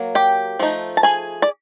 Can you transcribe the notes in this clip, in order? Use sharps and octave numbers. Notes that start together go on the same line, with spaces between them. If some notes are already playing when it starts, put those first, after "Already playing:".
Already playing: F#3 A#3
G4 G5
F3 A3 D#4
A5
G#4 G#5
D5